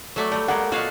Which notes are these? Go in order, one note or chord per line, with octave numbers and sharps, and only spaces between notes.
F#3 A3 D5
G3 A3
G3 G#3 A#3 F#5
B2 F4 F#4 C#5 F5